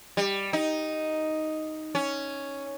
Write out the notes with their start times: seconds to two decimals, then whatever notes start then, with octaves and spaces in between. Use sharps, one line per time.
0.17 G3
0.53 D#4
1.95 C#4